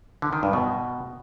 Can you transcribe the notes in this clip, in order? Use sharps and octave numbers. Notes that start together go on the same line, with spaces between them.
D3
D#3
G2
B2